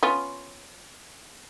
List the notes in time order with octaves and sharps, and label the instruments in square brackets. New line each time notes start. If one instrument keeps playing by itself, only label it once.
[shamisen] B3 C#4 F4